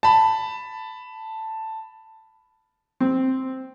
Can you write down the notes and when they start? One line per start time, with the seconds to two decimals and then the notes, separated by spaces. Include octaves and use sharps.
0.03 A5 B5
3.00 C4